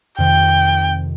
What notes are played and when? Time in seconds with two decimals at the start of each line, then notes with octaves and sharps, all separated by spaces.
0.19 F2 C3 D#3 G5